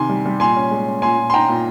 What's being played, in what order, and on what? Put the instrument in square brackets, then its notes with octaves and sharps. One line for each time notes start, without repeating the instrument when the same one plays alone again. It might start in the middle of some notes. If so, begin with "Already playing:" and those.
Already playing: [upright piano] C3 D#3 G#5 C6
G3
G3
A#2 G#5 C6
C#4
G#3
C#4
A#2 G#5 C6
A#2
C6
D#4 G5 A#5
A#2